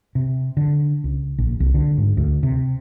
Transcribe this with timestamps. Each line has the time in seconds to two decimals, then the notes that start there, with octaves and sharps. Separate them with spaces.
0.15 C3
0.57 D3
1.04 C#2
1.38 A#1
1.60 C2
1.74 D3
1.98 G#2
2.17 D2
2.43 C3